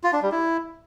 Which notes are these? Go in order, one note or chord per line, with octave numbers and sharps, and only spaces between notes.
F4
D4
G3
E4